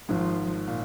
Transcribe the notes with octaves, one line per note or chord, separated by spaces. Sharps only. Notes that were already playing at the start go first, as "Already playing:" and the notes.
G#1 G#2 F3
A#2